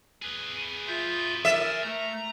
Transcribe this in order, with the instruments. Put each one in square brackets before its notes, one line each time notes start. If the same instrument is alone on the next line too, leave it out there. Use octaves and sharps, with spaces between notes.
[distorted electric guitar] G#4 B4
[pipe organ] F4 E5 G6
[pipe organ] A#4 A6 [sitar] E5
[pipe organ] A3 [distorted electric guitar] A#5